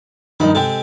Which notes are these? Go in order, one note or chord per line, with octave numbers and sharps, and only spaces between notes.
A#1 G2 D#3 D#4 B5
C3 G#3 A4 G5